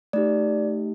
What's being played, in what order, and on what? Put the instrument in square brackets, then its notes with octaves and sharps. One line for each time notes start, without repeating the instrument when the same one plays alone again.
[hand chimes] A3 D#4 G4 D5